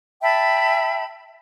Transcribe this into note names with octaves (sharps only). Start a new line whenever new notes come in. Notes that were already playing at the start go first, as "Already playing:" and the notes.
E5 G5 A5 B5